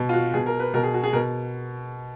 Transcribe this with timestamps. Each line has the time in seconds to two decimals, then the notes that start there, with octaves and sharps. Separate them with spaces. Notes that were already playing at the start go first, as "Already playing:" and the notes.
Already playing: B2
0.09 F4
0.13 F#4
0.34 B2 G#4
0.46 A#4
0.60 B4
0.74 B2 A#4
0.83 G#4
0.94 F#4
1.04 G#4
1.13 B2 A#4